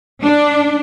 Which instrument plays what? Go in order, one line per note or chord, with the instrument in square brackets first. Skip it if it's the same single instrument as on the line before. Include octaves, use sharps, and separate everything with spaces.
[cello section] D4